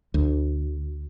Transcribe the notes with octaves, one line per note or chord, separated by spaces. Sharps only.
D2